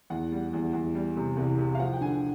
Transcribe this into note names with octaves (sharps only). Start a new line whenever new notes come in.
E2 F#5
G3
E2
E2
G3
C3
C2
C3
F5
F3 F#5
G5
D3 G#5